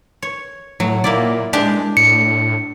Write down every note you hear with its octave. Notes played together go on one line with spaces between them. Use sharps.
C#5
A2 F#3
A#2 A#3 E4 D5
G#3 D4 G4
A2 C#7